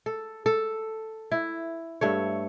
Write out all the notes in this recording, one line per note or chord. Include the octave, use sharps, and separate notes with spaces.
A4
A4
E4
G2 A3 C#5